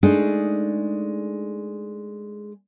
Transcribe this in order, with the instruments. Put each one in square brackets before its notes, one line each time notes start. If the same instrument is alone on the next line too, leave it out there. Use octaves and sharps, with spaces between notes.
[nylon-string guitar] G#3 A3 D4 D#4 G#4